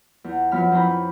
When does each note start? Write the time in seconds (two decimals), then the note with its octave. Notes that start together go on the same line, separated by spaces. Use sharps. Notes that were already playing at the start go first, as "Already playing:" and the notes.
0.24 E2
0.51 F#2 F3 B3 B5 F6
0.72 F2 E4 C5 A#5 B5